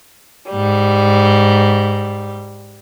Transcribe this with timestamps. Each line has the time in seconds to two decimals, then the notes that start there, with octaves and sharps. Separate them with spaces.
0.51 G#2 G3